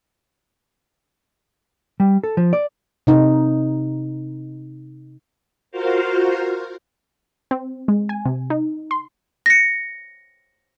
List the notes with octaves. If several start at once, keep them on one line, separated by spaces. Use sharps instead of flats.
G3
A4
F3
D5
C3 D#4
F4 F#4 A#4 C5 F5
C4
G#3
G#5
C3
D#4
C6
A#6 C#7